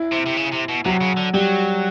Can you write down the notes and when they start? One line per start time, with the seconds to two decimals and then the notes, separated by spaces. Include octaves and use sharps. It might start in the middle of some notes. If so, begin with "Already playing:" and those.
Already playing: E4
0.12 C3
0.26 C3
0.37 C#3
0.53 C3
0.69 B2
0.85 C3 F#3 F#4
1.01 C#3
1.17 D3
1.33 F#3 G3 G4